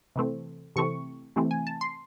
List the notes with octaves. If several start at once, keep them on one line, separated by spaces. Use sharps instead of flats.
C3 E3 A3 C4
C3 E3 A3 C4 C#6
C3 E3 A3 C4
G#5
A5
C6